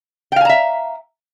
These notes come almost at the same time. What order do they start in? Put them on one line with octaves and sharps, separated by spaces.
G5 F5 G#5 A#5 E5